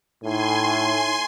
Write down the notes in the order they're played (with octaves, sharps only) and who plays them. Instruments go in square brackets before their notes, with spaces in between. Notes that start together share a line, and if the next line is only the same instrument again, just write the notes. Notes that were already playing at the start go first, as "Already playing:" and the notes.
[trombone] A2 [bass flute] D#4 [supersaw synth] G#5 C6